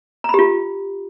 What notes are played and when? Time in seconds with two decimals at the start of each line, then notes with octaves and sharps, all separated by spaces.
0.24 A#5
0.29 B5
0.34 G4
0.39 F4